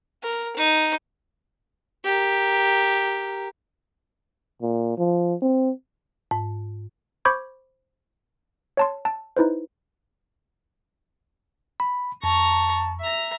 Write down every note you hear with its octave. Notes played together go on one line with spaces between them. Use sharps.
A#4
D#4
G4 A#4
A#2
F3
C4
G#2
C5 B5 C#6 D6 G6 G#6
C#5 A5 C6
A5
D#4 E4 B4 C5
B5
F2 A5 A#5 C#6
E5 A#5